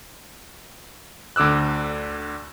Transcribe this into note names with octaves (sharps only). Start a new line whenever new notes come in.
D2 D3 D6 E6 F#6